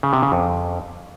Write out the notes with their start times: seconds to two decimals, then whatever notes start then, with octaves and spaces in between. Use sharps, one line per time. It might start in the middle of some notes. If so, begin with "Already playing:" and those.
0.03 C#3
0.13 C3
0.22 C#3
0.32 F2